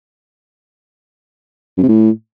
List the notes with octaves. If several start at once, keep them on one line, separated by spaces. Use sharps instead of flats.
F#2
C3
A2